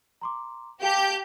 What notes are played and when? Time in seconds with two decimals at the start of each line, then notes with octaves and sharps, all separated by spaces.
0.21 A#5 C6 D6
0.82 G4 F5 G5 A5 G6